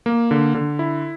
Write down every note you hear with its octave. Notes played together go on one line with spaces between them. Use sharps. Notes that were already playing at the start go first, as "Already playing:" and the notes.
A#3
D3
D3
E4